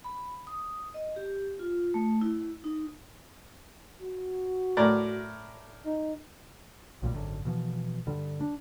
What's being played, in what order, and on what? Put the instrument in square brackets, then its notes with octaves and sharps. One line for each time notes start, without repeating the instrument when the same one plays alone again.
[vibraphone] B5
D#6
D#5
G4
F4
A3
E4
D#4
[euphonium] F#4
[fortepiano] A2 A#4 D5
[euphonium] D#4
[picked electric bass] B1 A#2 E3 G3
G#1 F#2 D3
B2 E3 F3
G2 D3 G3
D4